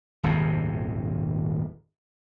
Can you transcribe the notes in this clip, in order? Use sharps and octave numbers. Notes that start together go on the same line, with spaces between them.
D#1 G#1 F2 C3